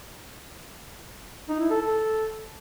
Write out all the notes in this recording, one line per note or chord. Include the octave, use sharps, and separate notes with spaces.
D#4
E4
A4
A4